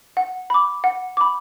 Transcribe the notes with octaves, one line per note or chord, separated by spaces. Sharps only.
F#5
B5 D6
F#5
B5 D6